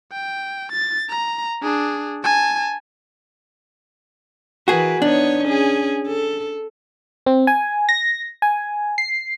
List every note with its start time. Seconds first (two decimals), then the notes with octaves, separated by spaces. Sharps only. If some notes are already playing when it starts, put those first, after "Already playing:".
0.12 G5
0.72 A6
1.09 A#5
1.63 D4 G#4
2.24 G#5 A5
4.68 E3 F#4 G#4 A#4 B4
5.02 B3 D4 D#4 C#5
5.44 C#4 G#4
6.07 A4
7.26 C4
7.47 G#5
7.89 A#6
8.42 G#5
8.98 C7